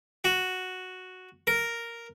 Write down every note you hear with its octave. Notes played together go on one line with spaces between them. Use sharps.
F#4
A#4